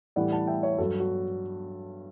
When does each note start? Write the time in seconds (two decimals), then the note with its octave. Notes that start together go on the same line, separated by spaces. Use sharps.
0.16 A2 E3 G3 D5 F#5
0.32 F#5 A5
0.47 E5 G5
0.63 C#5 E5
0.78 G2 F#3 F#4 A4
0.99 F#4